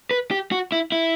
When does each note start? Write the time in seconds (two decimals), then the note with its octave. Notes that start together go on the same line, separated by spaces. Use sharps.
0.11 B4
0.31 G4
0.52 F#4
0.72 E4
0.92 E4